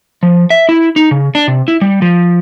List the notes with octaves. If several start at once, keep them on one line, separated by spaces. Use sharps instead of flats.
F3
E5
E4
D#4
C#3
D4
C3
E4
G3
F3